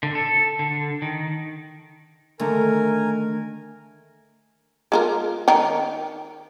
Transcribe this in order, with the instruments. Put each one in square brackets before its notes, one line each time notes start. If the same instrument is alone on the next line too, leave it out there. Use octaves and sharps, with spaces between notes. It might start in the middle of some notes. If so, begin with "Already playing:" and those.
[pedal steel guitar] D3
A4
D3
D#3
[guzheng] D3 [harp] D#3 A3 [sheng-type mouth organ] A#4 G#5
[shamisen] G#3 F4 A#4
D#3 A#4 G5